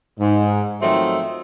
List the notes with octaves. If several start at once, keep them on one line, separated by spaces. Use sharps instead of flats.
G#2
D#3 F3 F#3 A3 C4